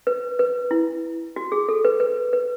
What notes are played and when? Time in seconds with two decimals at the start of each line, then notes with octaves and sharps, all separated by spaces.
0.07 B4
0.39 B4
0.71 E4
1.36 F#4
1.52 G#4
1.68 A4
1.85 B4
2.00 B4
2.33 B4